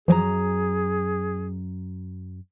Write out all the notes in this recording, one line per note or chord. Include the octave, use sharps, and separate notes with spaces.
F#2 E3 F3 G4 G#4 A#5